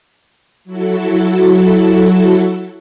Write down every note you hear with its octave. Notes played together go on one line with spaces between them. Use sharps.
F#3 E4 F#4 A4